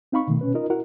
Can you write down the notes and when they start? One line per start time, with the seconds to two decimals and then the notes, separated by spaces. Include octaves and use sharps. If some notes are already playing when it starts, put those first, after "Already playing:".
0.12 C4 D#4 F5 B5 C#6
0.27 B2 D3 D#3 A3
0.41 B2 C#4 B4
0.54 D#4 F4 A#4 D#5
0.70 E4 F#4 A#4 F#5